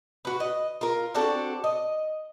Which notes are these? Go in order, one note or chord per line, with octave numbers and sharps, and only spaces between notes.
F#4 B4
D#5
F4 A#4
C4 D4 F#4 A4
D#5